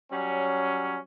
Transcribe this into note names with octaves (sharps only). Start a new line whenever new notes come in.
F#3 G3 C#4